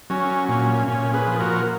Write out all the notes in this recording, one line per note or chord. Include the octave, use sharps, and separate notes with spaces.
F#3 C#4
A#2 C#4
A#2 C#4
G#4 B4
F3
F#4 A#4